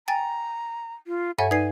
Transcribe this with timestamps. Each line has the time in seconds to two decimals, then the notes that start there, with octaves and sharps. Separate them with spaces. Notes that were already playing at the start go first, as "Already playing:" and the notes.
0.08 G5 G#5 A#5 A6
1.07 F4
1.38 G2 A4 C#5 E5 F#5 G#5
1.51 D#4 B4 D5 G#5 G#6 C7